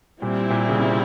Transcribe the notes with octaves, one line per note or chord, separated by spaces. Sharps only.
A#2 G3 C4 E4
A#2
C#3
C3